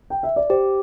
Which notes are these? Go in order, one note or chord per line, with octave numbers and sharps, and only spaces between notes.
G5
E5
D5
G4 C5